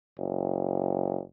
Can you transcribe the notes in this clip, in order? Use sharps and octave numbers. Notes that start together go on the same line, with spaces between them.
F#1